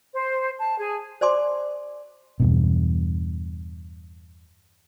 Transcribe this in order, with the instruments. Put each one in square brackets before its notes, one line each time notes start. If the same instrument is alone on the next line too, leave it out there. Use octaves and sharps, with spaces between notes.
[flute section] C5
A5
G#4
[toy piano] C5 D5 G#5 C6 D6
[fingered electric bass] E2 G2 B2